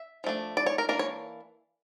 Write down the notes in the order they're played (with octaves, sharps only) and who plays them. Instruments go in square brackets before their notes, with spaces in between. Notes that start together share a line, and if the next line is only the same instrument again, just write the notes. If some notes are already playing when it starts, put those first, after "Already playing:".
Already playing: [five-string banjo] E5
F3 A3 D4
D5
C#5
A#4
E3 A#3 D4 A#4
C#5